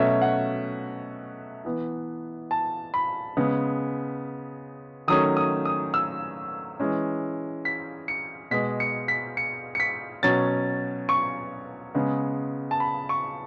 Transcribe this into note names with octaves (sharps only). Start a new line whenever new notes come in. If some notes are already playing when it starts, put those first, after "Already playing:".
Already playing: B2 F#3 A3 C#4 E5
F#5
E3 B3
A5
B5
C#3 G#3 B3
D#3 F#3 A3 C#4 D#6
D#6
D#6
E6
E3 G#3 C#4
B6
C#7
B2 G#3 B3 B6
C#7
B6
C#7
C#7
B6
B2 F#3 C#4 A6
C#6
C#3 G#3 B3
A5
B5
C#6